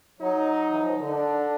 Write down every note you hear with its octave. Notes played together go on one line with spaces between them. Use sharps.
F#3 D#4
E3
F3
D#3
D3
D4